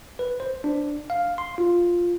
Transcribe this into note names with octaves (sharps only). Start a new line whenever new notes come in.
B4
C5
D4
F5
C6
F4